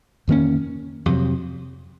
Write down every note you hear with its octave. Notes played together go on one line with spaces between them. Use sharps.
F2 D#3 A#3 C#4
F2 C3 F#3